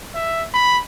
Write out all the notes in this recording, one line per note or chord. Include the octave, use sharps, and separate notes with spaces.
E5
B5